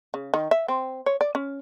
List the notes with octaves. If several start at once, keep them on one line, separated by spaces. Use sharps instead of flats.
C#3
D#3
E5
C4
C#5
D5
C#4